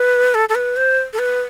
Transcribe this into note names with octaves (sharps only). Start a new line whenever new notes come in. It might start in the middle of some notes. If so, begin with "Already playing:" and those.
Already playing: B4
A4
A4
B4
C5
A4
B4